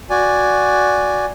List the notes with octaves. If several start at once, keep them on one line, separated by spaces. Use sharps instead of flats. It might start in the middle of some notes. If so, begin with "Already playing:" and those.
F#4 D5 G#5